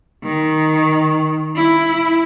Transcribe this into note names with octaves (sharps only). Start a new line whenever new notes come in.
D#3
E4